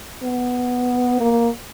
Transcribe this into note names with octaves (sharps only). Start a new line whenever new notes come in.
B3
A#3